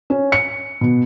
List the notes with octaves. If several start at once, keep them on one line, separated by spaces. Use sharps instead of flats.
C#4
C#7
B2